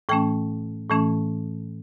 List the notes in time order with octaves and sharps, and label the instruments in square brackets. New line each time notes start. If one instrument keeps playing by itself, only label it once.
[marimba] A2 E3 A3 C#4 G5
A2 E3 A3 C#4